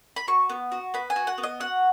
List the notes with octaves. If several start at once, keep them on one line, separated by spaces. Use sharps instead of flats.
B5
F#4 C#6
B3
F#4
B3 B5
G#5
F#4
F#5
B3
D#5
F#4 F#5